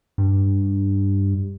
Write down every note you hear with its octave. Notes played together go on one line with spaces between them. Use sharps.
G2